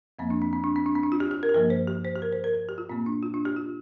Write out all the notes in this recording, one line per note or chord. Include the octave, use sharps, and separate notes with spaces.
F2 F3 A#3 C4
D4
C4
C4
D4
C4
D4
C4
D4
F4
G4
G4
A#4
G4
G2 F3 A#3 A#4
C5
G4
C5
G4
A#4
C5
A#4
A#4
G4
F4
A#2 A#3 C4
D4
F4
D4
G4
F4